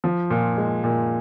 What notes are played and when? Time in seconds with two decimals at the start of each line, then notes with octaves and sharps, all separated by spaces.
0.04 F3
0.30 A#2
0.57 G#3
0.84 A#2